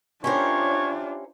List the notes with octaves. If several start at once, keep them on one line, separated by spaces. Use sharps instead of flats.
C#4 D4 E4 F4 G4 A#4 C5 C#5